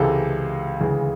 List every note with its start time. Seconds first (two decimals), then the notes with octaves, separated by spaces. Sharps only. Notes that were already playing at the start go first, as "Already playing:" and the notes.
Already playing: C#2 C3 E3 G#3 A4
0.80 D2 C#3 E3 G#3